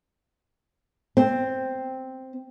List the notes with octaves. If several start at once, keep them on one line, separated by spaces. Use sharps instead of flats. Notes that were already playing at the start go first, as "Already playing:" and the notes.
C4